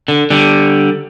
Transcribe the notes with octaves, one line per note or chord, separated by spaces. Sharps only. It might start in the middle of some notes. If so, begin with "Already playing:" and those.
D3
D3 G3